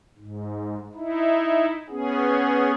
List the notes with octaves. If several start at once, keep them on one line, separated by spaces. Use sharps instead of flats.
G#2
D#4 E4
B3 C#4 G#4